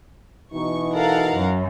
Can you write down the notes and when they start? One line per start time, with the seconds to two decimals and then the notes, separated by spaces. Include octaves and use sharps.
0.53 B2 E3 D#4 C#6
0.96 A4 A#4 F5 F#5
1.34 F#2